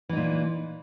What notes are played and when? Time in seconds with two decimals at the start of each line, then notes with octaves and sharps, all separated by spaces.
0.09 E3
0.13 D#4
0.17 A#2